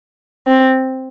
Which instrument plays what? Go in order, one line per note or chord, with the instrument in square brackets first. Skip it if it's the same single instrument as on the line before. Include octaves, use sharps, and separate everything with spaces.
[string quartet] C4